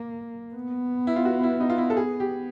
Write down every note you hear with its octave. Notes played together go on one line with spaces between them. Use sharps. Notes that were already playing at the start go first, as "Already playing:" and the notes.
Already playing: A#3
B3
E4
F4
F#4
E4
D#4
F4
E4
A4
G#4
G4